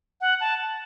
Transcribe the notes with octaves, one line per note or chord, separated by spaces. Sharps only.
F#5
A5